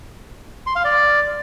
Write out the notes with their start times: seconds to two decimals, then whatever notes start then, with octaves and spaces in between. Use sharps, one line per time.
0.67 C6
0.76 F5
0.85 D5